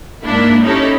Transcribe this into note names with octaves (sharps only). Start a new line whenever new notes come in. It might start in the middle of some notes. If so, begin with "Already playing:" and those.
G#2 A#3 D4 E4
C#4 D#4 E4 G4 A4